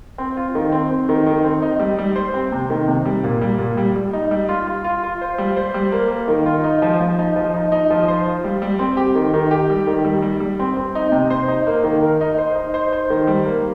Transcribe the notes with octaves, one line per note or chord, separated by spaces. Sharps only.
C4
F4
D#3
C4
C4
D#3
D#3
C4
D#4
G3
G3
C5
C4
C3
D#3
C3
G3
A#2
G3
A#2
G3
G3
D#4
G3
F4
F4
F4
F4
C5
G3
C5
G3
A#3
A#3
D#3
F4
D#4
F3
F3
D#4
F3
D#4
D#4
F3
C5
F4
G3
G3
C4
G4
D#3
D#3
G4
G3
D#3
G3
G3
G3
C4
C4
D#4
C3
C5
D#4
A#3
D#3
A#4
D#4
C5
D#4
C5
C5
D#3
G3
A#3